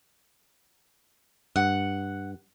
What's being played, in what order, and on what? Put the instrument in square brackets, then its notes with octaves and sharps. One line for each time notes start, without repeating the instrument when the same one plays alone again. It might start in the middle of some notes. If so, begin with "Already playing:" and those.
[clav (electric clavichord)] G2 [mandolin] F#5